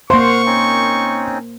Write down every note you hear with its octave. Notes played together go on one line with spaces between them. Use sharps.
A#3 C5 F5 F#5 C6 C#6 F6
C4 C#4 D#4